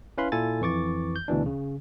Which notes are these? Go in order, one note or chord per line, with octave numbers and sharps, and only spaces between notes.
C#4 E4 B4 F5 B5 C6
A#2 E4 F4 A4 G#5 A6
F2 E3 C#6 D6 A6
G6
D2 B2 E3 D4
C#3